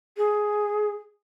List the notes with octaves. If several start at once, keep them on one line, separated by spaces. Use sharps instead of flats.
G#4